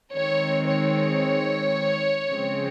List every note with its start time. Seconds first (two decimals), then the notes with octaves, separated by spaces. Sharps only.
0.15 D#3 G#3 C4 C#5
0.69 C#5
2.29 C#3 F3 G#3 C4